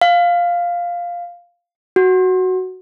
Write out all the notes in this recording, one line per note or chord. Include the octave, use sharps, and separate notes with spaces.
F5
F#4